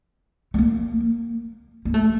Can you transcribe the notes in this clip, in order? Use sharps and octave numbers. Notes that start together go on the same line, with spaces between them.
A3
A#3
A#3
A3